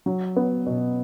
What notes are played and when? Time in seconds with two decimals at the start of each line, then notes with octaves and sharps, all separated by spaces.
0.06 F#3
0.36 B3
0.66 B2